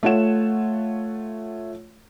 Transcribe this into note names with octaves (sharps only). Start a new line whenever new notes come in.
A3 F4 C#5 F#5 E7